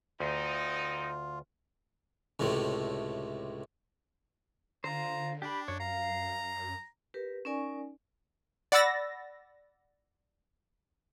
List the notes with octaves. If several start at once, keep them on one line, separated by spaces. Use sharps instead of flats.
D2 B3 C4 D#4 F4
C#2 A2 C3 A3
D3 F4 C5 A#5
D4 G4 B5
F#2 C#5
F5 A#5
G4 A#4 B4
C#4 D#4 A#4 D5 G#5 C#6
D5 F#5 B5 E6 A6 A#6